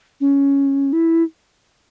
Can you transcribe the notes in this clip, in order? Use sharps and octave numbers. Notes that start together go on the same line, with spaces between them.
C#4
E4